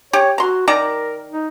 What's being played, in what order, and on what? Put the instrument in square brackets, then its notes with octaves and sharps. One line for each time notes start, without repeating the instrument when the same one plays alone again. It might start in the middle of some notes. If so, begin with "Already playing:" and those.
[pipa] G4 [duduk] C#5
[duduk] F#4 [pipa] A#5 C6
[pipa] D#3 D5 A#5 [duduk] A#4
[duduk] D#4